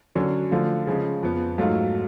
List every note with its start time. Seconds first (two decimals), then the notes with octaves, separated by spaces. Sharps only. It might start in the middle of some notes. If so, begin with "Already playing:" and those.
0.15 D3 F#3 C#4
0.51 D3 F3 A3 F4
0.87 C#3 F3 G#3 C#4
1.23 F2 F3 B3
1.58 G#2 F#3 A3 F4